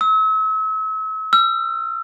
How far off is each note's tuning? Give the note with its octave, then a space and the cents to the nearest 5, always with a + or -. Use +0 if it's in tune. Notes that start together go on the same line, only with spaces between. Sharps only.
E6 -40
E6 +40